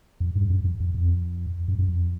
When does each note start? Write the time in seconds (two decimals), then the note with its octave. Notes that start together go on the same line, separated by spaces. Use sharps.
0.20 F2
0.35 G2
0.50 F#2
0.64 F2
0.80 F2
0.95 F2
1.68 F#2
1.79 F#2
1.88 F2